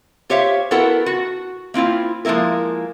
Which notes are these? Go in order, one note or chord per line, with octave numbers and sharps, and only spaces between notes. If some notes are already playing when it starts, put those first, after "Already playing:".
F4 G4 C5 C#5 E5 F5
B3 E4 F#4 A4 A#4 F#5
F#4
A#3 C4 E4 F4
F3 G#3 A#3 E4 A#4